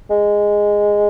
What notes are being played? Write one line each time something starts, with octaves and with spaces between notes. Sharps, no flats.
G#3